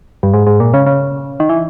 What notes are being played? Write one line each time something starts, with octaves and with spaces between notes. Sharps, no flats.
G2
G#2
G#2
A#2
C#3
C#3
D#3
E3